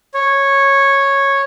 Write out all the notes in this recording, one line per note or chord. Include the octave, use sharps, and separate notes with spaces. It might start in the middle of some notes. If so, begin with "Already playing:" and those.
C#5